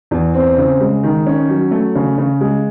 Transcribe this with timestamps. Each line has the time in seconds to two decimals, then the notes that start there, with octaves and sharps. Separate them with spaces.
0.11 E2
0.34 C4
0.58 C#3
0.81 G#3
1.03 D#3
1.26 C#4
1.49 F#3
1.71 A3
1.95 C#3
2.18 C#3
2.41 G#3